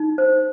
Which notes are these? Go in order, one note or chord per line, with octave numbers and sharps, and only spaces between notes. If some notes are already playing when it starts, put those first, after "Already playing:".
Already playing: D#4
C5